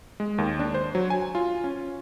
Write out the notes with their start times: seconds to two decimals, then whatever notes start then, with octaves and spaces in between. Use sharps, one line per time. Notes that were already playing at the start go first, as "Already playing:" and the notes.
0.20 G#3
0.38 D#2
0.59 D4
0.74 C5
0.95 F#3
1.10 G#5
1.35 F4
1.64 C#4